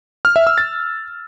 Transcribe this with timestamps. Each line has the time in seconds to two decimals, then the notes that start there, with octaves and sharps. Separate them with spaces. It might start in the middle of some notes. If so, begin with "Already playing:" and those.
0.25 F6
0.36 E5
0.47 E6
0.58 A6